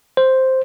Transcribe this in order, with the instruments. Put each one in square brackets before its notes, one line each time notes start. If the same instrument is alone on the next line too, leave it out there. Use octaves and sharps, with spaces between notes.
[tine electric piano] C5